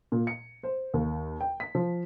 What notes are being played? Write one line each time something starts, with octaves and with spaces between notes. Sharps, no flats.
A#2
C#7
C5
D#2
G5
B6
F3